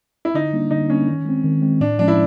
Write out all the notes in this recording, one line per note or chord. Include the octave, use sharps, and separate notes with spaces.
E4
D3 D#4
G3 A#3 D4
D3 D#4
G3 A#3 C#4 D4
D#3
G#3 C4
D#3
G#3 C4
A2 D4
F3 G#3 C#4 D4
E4